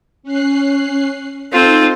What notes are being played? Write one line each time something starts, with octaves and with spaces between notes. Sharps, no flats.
C#4 F#6 C7
C4 D#4 F4 A4 C5